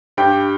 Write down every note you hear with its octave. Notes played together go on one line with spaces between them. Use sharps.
G2 G4 G5